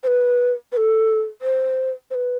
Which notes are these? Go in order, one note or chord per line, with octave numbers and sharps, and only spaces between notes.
C5
B4
B4
A4
C5
C5
B4